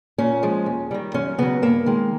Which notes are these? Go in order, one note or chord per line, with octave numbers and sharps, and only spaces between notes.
A#2 C#4
F3 G#3
D#2
D#3 G3
F#2 C#4
C#3 F#3 B3
G2 A#3
D#3 G#3